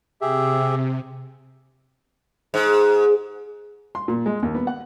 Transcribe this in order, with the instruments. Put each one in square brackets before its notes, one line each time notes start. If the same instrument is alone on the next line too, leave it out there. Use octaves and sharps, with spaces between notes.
[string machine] C3 [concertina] G4 G#4 E5
[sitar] G#2
[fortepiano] C6
A#2
G#3
D#2
B3
F#5